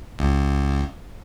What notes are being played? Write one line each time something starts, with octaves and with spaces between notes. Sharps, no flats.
C#2